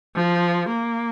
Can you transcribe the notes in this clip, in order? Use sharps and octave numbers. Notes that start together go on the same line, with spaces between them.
F3
A#3